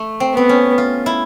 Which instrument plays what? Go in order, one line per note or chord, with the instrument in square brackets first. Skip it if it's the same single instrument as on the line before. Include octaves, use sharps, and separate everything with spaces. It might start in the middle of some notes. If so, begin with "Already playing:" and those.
Already playing: [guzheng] A3
C4
[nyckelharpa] B3 [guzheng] C4
[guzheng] C#4
F4
E4